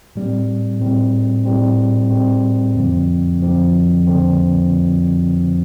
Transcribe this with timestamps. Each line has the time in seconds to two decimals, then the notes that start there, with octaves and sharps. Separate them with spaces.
0.16 A2 G3 C4
0.80 A2 G3 C4
1.45 A2 G3 C4
2.11 A2 G3 C4
2.75 F2 D3 F3 C4
3.41 F2 D3 F3 C4
4.07 F2 D3 F3 C4